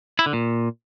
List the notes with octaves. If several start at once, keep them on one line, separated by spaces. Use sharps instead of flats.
E4
D3
A#2